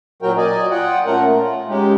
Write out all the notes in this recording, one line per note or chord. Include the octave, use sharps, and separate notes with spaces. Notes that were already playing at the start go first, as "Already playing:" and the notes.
A#2 F#3 C#4 F#4 A#4 G5
D5 D#5 G#5
F4 F#5 G5
A#2 A3 C#4 A#4 F#5
F4
G#3 C#4 D#4 G4